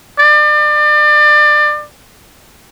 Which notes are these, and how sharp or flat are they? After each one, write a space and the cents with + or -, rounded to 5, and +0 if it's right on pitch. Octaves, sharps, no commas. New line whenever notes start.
D5 +30